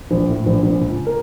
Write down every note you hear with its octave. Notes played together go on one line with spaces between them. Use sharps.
A#1
A2
A#1
A#1
C#2
A#4